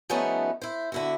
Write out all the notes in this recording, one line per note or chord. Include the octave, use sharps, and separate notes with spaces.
F3 G3 A3 B3 C#4 D#4
E4 C5
D3 E4 F#4